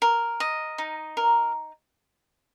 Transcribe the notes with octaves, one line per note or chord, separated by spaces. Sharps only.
A#4
D#5
D#4
A#4